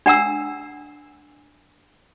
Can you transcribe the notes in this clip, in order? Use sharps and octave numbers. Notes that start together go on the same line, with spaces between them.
D4 F#5 A#5 E6